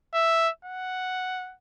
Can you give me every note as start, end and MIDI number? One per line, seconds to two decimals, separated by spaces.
0.14 0.50 76
0.65 1.55 78